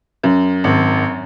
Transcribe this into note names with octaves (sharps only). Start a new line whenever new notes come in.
F#2
G#1